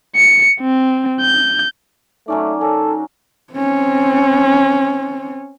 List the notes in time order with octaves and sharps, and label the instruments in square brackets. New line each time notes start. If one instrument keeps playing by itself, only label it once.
[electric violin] C#7
C4
G6
[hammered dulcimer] F#3 C#4 D5 [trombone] A3 [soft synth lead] D#4
[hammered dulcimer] C#4 F#4 A#4 [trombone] A4
[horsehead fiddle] C4 C#4